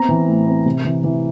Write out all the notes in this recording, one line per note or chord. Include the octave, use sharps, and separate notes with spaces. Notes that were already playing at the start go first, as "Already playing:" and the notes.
Already playing: B3 C4 A#5
E3
A2
C4
C3
E3
E3